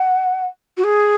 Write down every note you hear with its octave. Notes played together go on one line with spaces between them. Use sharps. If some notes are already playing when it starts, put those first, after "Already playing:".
Already playing: F#5
F#4
G#4